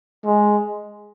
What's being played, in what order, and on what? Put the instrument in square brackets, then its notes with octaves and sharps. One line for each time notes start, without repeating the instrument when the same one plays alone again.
[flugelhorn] G#3